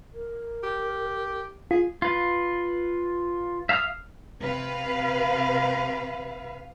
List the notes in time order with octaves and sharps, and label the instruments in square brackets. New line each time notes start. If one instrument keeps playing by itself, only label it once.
[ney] A#4
[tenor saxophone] G4
[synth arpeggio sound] F4 [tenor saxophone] G#4
[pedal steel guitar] F4 B4
E5 F5 A5 D#6 F6
[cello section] C3 B4 F5